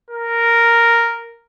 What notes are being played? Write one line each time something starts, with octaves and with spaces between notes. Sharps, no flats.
A#4